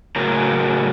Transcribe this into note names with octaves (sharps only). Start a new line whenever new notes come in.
A2 C#3 F#3 A#4 A#5